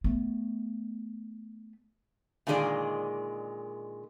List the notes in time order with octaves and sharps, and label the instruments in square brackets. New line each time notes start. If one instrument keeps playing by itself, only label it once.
[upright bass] A3 B3
[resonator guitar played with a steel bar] A#2 D3 D#3 G#3 G#4 D5